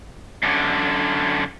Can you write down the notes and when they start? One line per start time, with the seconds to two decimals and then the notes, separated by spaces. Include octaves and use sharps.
0.43 F#2 D3